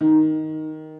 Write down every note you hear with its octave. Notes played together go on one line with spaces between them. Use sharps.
D#3